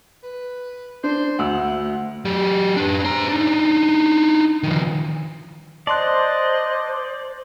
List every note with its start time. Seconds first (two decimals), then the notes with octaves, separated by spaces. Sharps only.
0.23 B4
1.04 D4 C5
1.39 D2 F#5 E6
2.25 F#3 G4
2.77 D4 B4
3.04 C5 A#5
3.28 D4 D#4
4.63 D#3 F3
5.87 C5 D5 D#5 A5 C6 F#6